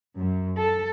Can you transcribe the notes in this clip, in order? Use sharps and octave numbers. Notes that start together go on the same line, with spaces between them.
F#2
A4